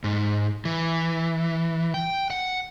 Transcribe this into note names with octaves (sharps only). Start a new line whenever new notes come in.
G#2
E3
G5
F#5